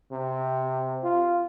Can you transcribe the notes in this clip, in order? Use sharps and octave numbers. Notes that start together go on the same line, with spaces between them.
C3
F4